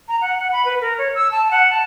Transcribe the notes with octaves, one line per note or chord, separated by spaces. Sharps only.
A#5
F#5
F#5
B5
B4
A#4
C#5
E6
A5
F#5
A5